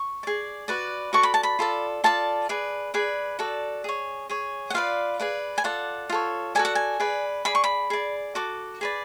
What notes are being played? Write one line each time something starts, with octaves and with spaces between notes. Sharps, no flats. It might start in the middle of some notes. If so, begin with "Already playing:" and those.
Already playing: C#6
G#4 D5
F#4 B4 D5
F#4 A4 D5 C#6
B5
A5
B5
F4 A4 D5
F4 A4 D5 A5
G#4 B4 D5
G#4 B4 D5
F#4 A4 D5
G#4 C#5
G#4 C#5
F#5
F4 B4 D5 F5
G#4 B4 D5
G#5
F4 A4 D5 F#5
F4 A4 C#5
F#4 A4 D5 G#5
F#5
G#5
G#4 B4 D5
G#4 D5 B5
C#6
B5
G#4 D5
F#4 A4 D6
G#4 B4 D5